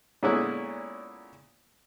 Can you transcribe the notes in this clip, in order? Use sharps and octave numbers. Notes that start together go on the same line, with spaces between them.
A#2 D3 G#3 B3 C#4 E4